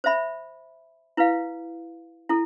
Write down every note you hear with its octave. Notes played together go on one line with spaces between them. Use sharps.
C5 E5 B5
E4 B4 F5
E4 A4